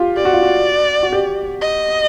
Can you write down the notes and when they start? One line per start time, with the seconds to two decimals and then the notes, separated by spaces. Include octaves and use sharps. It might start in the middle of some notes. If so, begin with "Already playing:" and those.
Already playing: F4 G4
0.17 G4 D5
0.25 F#4
0.33 F4
0.43 F#4
1.03 F#4
1.13 G4
1.62 D#5